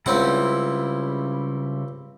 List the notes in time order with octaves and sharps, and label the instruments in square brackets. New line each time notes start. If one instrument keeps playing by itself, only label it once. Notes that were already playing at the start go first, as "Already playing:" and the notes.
[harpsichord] C#2 C4 F#5 [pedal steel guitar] C#3 G3 E4